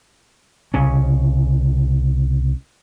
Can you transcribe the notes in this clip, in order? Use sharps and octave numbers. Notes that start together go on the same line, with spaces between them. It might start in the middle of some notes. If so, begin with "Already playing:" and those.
C2 C#3 C#4